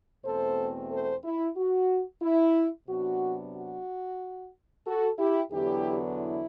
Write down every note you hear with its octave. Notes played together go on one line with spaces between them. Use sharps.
E2 B2 A3 C4 A4 C5
A4 C5
E4
F#4
E4
C3 F#3 B3 D4 F#4
F#4
F#4 A4
E4 G4
E2 D3 F#3 B3 D4 E4 G4
E4